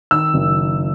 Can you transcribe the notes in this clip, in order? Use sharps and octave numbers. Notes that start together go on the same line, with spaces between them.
D#3 E6
F#1